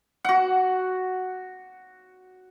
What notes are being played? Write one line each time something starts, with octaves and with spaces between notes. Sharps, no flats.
F#4 F#5